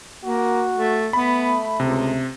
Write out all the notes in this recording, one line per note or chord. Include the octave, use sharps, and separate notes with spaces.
A#3 F#4
A3
A3 B3 B5
C#2 C3